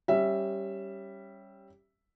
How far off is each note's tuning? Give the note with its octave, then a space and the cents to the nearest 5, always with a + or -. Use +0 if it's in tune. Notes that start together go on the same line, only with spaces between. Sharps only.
G3 +0 C#4 -10 E5 +0